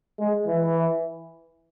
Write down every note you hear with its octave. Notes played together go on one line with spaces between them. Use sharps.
G#3
E3